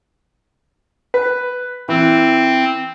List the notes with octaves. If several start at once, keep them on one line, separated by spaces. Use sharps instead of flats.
B4
E3 C4